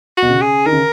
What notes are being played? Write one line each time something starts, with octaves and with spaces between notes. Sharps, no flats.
F#4
B2
C#3
G#4
D#3 A#4
C#3